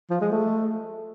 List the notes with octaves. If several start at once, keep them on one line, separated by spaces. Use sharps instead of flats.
F3
G#3
A3